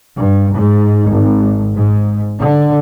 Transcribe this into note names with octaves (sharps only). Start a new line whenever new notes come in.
G2
G#2
G#1
G#2
D3